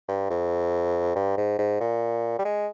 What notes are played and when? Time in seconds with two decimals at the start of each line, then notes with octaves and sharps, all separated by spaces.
0.08 G2
0.30 F2
1.16 G2
1.37 G#2
1.59 G#2
1.80 A#2
2.39 G3
2.45 G#3